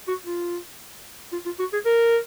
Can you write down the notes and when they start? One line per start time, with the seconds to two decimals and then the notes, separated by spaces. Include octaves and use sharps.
0.08 F#4
0.25 F4
1.32 F4
1.46 F4
1.59 F#4
1.73 G#4
1.86 A#4